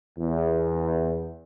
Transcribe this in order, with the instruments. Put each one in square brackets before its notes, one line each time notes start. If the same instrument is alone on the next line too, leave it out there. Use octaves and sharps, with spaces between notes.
[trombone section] E2